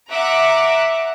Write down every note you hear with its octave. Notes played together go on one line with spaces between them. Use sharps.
E5 F#5 A#5 D6 F#6